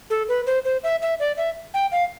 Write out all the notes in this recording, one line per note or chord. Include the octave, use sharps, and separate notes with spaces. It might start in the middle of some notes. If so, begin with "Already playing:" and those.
A4
B4
C5
C5
E5
E5
D5
E5
G5
F5